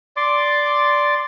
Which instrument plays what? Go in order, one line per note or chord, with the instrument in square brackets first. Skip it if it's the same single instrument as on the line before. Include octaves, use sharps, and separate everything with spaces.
[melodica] D5 C6 D6